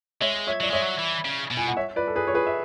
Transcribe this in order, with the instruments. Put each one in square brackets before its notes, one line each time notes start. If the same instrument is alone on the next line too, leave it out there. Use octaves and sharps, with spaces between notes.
[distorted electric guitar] G#3 [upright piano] C#5 E5
[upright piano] C#5 E5
[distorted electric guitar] F#3 [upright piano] D5
[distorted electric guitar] G#3 [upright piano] C#5 E5
[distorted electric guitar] F#3
E3
C#3
B2
[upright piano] G#5
F#5
C#5 E5
B4 D5
A4
G#4 B4
C#5
G#4 B4
E5